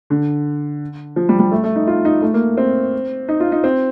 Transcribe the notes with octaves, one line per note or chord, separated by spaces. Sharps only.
D3
F3
G3
G3
A3
A3
D#4
F4
D#4
A3
A#3
C4
D#4
F4
D#4
C4